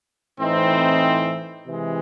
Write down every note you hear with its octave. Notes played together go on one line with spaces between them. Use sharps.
A2 E3 C4 D#4
C3 E3 G#3